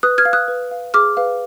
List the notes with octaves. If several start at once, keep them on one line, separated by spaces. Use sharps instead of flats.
B4 D#6 F#6
F6 G#6
F5
D#6 F#6
B4
F5
G#4 D6 F6
B4 F5